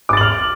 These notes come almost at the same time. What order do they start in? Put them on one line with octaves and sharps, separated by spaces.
D6 A6 F#7 F6